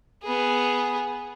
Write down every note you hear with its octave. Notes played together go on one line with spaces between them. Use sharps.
B3 G#4